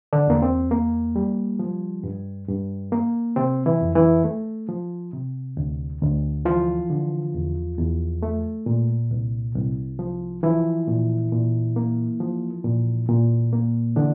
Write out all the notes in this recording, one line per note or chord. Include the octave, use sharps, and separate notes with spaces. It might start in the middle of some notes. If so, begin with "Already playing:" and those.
D3 D4
E2 A#3
C4
A#3
G3
F3
G2
G2
A#3
C3 C4
E3 E4
F2
E3 E4
A3
F3
C3
D2
D2
E3 F3 F4
D3
E2
E2
A3
A#2
C2
C2
F3
E3 F3 E4
A#2
A#2
A#3
F3
A#2
A#2
A#3
D3 E3 D4